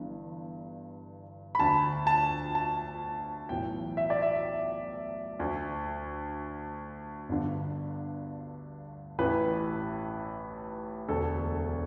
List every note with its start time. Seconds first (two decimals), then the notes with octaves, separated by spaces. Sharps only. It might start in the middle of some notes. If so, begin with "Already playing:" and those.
Already playing: G1 G2 E3
1.55 B5
1.59 D2 D3 A5
2.07 A5
2.55 A5
3.49 B1 A2 E3 G5
3.97 E5
4.10 D5
4.22 E5
5.39 D2 D3
7.29 G1 G2 D3
9.18 A1 A2 E3 B4
11.08 E1 D2 D3 A4